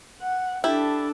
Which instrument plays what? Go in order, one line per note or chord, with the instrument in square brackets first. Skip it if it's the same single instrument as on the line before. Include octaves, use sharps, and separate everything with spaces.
[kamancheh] F#5
[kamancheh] D4 A4 [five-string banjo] E4 G4